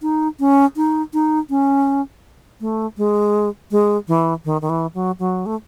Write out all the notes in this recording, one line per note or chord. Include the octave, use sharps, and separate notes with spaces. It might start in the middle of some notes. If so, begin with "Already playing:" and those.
D#4
C#4
D#4
D#4
C#4
A3
G#3
G#3
E3
D#3
D#3
E3
F#3
F#3
A3